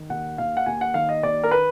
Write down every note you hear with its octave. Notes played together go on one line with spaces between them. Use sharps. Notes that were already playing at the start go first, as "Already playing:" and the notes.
Already playing: D#3
D#2 F#5
D#2 F5
F#5
D#2 G#5
F#5
D#3 F5
D#5
D#2 D5
A#4
B4